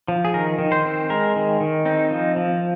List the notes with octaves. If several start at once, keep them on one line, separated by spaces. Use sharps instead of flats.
F3
G#4
D#3 A#4
D#3
C5
C4
G#3 A#4
D#3
D#3
C4 D#4
F3
F3